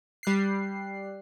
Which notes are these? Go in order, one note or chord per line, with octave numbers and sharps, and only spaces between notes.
G3 F#6 C7